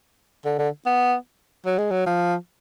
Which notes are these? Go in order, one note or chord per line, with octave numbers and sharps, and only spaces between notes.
D3
D3
B3
F#3
G#3
F#3
F3